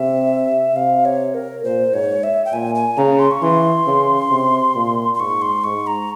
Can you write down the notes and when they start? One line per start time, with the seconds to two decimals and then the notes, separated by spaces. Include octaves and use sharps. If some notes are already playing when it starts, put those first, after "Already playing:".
Already playing: C3 E5
0.75 C3 F5
1.05 C#5
1.34 A#4
1.64 A#2 C5
1.94 G#2 C#5
2.23 E5
2.45 G5
2.53 A#2 G#5
2.75 G#5
2.97 C#3 A#5
3.19 C6
3.31 C#6
3.42 E3 C6
3.87 C#3
4.30 C3
4.75 A#2
5.14 C6
5.20 G#2 C#6
5.42 C6
5.64 G#2 C#6
5.87 A#5